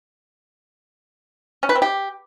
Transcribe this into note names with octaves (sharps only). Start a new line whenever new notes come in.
C#4
B4
C4
G4